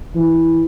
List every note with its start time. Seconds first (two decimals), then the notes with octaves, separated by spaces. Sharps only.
0.15 E3